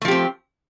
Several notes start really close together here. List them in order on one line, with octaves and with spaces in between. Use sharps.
A3 F3 G4 C4